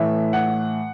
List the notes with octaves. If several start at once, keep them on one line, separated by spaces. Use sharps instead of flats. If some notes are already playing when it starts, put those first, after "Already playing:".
Already playing: A2 E3 A3 E5
F#5